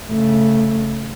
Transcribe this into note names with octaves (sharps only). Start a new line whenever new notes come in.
C#3 A3